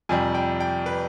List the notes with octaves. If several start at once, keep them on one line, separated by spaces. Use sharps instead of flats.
F2 C3 G3 G#5
G5
G5
B4